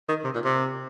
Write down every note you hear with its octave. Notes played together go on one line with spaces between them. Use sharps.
D#3
C3
A#2
C3